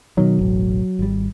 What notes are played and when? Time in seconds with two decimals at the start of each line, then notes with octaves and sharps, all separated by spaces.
0.17 B2 D#3 F#3
0.39 E1 A1
0.99 G#1 G3